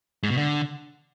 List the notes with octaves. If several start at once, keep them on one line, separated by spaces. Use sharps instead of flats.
G#2
B2
D3